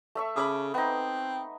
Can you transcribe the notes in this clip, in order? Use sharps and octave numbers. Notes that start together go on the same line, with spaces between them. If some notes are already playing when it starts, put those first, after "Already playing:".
A3 E5 C#6
C#3 B5 D6 D#6
B3 C4 D#4